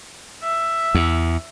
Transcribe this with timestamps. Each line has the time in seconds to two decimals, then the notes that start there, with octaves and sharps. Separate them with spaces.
0.44 E5
0.95 E2